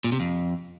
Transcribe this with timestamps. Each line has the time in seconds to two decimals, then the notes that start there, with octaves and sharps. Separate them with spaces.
0.04 A#2
0.12 C3
0.20 F2